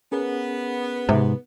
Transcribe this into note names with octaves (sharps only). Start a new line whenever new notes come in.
B3 C#4 G#4 A#4
G#2 C3